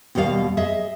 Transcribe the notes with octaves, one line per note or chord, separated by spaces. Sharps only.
D#2 B2 G3 A4 F5
G#4 D#5 E5